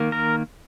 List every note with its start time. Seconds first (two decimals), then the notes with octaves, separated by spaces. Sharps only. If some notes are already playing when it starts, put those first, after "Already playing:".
Already playing: D#3 A#3
0.12 A#4